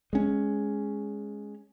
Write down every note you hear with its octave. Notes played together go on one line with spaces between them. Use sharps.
G#3 C#4